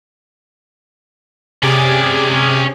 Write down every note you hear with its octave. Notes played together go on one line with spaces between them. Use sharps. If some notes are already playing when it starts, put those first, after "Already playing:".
C3 C#4 G4 G#4 D5 G#5